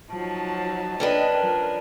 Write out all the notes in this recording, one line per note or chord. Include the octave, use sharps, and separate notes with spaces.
F3 F#3 D#4 A5
C#4 D4 B4 D#5 G5
F3 A#4